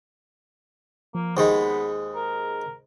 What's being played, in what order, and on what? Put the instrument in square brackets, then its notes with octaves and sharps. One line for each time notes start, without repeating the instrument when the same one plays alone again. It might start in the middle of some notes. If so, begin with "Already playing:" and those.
[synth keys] F3 [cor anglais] A#3
[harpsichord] D#2 D#3 G#3 [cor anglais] B3 [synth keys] G#4 C5
[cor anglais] A#4